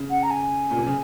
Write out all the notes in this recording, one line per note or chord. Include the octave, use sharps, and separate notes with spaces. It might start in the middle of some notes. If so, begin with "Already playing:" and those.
Already playing: C#3
F#5
A#5
G#5
A#2
C3
C#3